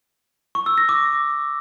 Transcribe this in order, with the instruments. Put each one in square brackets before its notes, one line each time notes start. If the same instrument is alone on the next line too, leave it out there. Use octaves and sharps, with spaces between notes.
[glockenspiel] C#6
E6
A#6
D6